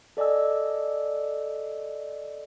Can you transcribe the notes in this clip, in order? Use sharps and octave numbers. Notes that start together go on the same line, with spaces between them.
A4 D5 D#5 G#5 E6